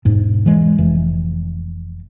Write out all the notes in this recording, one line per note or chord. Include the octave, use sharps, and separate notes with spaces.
E1 G#2
E3 G#3
F1 E3